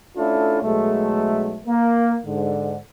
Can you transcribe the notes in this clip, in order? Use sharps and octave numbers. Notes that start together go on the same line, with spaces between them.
A3 C#4 D4 E4 F4 A4
B1 F#3 G#3 A3
A#3
G#2 D3